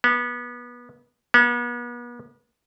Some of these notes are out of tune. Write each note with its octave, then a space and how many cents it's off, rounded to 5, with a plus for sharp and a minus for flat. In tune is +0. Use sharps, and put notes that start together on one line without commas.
B3 -25
B3 -40